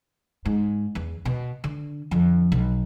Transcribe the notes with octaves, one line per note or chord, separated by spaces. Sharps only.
G#2
E2
B2
D3
F2 D3
B1